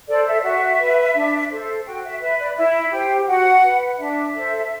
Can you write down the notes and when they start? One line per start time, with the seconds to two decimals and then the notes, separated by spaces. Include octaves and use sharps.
0.08 A4 C5 D5
0.27 E5
0.39 D5
0.43 F#4 E5
0.79 B4
1.15 D4
1.51 A4 C5
1.85 F#4 G5
2.04 E5
2.21 B4 E5
2.39 D5
2.57 E4 E5
2.92 G4 C5 G5
3.27 F#4 F#5
3.64 B4
3.99 D4 E5
4.34 A4 C5